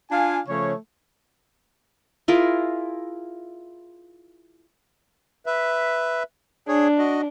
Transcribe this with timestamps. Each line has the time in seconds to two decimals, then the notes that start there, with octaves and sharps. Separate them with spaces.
0.11 D4 F4 F5 G#5
0.48 C#3 F3 A3 C#5
2.28 E4 F4 G#4 A#4
5.46 B4 E5
6.68 D4 G#4 C#5
6.99 F#4 D#5